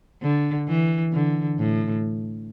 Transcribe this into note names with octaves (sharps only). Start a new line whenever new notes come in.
D3
E3
D3
A2